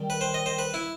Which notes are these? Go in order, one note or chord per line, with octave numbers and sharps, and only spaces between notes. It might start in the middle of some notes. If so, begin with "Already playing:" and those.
Already playing: D#3 G3
B4
C5
D#5
C5
B4
E4